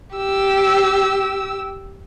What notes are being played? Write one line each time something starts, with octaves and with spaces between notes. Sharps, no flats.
G4 E6